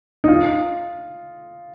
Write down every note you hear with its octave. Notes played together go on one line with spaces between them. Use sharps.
D#4
F4